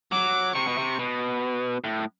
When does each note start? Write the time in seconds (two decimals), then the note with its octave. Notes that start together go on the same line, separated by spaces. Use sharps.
0.12 F#3 D6
0.55 C3 C#6
0.67 B2
0.78 C3
0.99 B2
1.84 A2